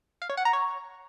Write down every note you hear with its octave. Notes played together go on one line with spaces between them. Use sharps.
F5
C#5
F#5
A#5
C#5